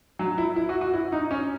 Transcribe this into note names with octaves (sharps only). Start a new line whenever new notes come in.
F#3
E4
E4
F#4
F#4
E4
D#4
C#4